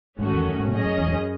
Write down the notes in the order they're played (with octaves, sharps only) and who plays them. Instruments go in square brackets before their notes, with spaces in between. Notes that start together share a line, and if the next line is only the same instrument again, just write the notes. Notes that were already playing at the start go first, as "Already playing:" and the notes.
[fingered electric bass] G#2 [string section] D#3 A3 C#4 F#4
[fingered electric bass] E2
F#2
G#2
B2
[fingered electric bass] A2 [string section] F#3 C#4 G#4 D#5
[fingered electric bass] F#2
E2
G#2
F#2